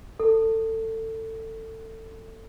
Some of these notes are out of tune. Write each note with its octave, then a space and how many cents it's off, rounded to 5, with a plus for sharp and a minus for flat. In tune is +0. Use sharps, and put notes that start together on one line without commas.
A4 +25